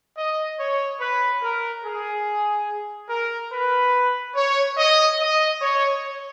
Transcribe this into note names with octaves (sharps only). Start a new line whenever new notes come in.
D#5
C#5
B4
A#4
G#4
A#4
B4
C#5
D#5
D#5
C#5